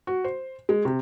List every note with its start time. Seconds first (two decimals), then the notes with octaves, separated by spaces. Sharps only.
0.07 F#4
0.25 C5
0.69 G#3
0.85 C3